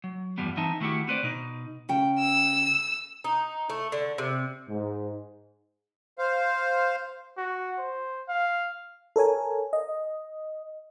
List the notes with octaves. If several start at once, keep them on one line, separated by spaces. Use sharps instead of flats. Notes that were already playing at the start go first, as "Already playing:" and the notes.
F#3
E2 G2 F3 G3 B3
E3 C4 D#4 E5 A5
D#3 A3 E4 F#4 G4
C4 B4 C5 D5
B2 D#4
C#3 G5
E6
D#4
A3
D3
C3
G#2
C5 F5
F#4
C5
F5
A4 A#4 C#5 G#5
D#5